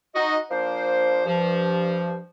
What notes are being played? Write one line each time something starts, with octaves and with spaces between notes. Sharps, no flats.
D#4 F#4 D#5
F3 A#3 D4 C5
G2 F3